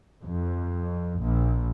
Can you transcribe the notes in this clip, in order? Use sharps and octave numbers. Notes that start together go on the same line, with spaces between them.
F2
A#1